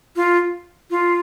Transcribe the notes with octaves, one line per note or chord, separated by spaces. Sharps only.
F4
F4